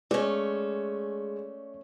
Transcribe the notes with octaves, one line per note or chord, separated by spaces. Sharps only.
G#3 A3 C#4 D5